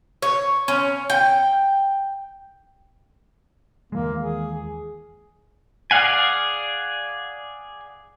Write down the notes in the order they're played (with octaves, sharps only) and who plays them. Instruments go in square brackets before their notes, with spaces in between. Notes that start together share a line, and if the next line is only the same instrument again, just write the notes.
[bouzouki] C#5
C#4
G5
[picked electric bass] D#2 E3 G#3 [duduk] A#3
[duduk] G#4
[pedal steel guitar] G#4 D5 F5 F#5 G#5